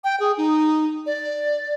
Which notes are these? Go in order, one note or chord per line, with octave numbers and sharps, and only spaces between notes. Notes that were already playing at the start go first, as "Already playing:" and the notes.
G5
G#4
D#4
D5